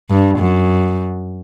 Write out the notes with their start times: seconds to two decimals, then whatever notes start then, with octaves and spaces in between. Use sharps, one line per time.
0.10 G2
0.38 F#2